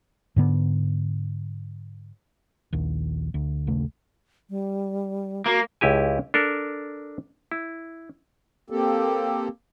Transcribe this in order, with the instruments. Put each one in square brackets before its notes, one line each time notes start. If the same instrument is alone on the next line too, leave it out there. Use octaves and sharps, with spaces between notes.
[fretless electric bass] G#2 D3 B3
[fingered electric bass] A#1 D#2
D2
A#1 D#2 C#3 A3
[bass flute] G3
[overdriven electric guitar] A#3 [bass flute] F#4
[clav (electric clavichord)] C#2 E4 G4 G#5
D4 A4 A#4
E4
[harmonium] A#3 C4 G4 A4